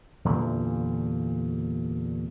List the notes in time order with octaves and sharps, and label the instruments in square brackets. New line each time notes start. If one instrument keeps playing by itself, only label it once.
[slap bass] E2 G2 A#2 D3